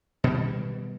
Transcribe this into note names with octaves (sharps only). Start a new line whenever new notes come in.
B2 D#3 G3